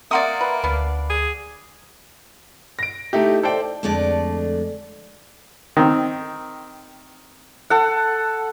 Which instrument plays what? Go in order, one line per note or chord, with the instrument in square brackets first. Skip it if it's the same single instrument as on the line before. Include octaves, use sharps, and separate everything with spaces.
[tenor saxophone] A#3 [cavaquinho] D5 F#5 D#6 [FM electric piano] E5 A#5 C6
[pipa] B4
[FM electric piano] D2 [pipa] B3 D4 F5
[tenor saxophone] G#4
[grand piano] A#6 D7
A3 D#4 E4 G4
A4 C5 D5 G5
[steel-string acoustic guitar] F2 D3 G#3 A3 D4 D5
[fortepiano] D#3 C4
[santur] A4 F#5